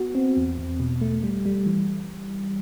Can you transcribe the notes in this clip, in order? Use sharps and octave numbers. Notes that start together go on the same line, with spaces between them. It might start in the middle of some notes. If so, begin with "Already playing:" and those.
Already playing: B3 F#4
C4
E2
E2
B2
A3
G3
G3
E3